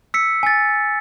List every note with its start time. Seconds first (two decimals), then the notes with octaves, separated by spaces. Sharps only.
0.14 E6 B6 C#7
0.43 G#5 A6